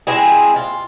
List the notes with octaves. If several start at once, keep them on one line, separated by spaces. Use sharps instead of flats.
G#3 C4 E4 G#4
F4